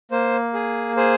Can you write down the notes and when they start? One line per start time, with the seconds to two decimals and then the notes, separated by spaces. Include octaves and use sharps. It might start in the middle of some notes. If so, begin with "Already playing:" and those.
0.11 A#3 C5
0.54 G#4
0.96 G#4 C5